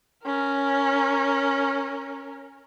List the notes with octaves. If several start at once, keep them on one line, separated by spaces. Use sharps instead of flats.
C#4 A#4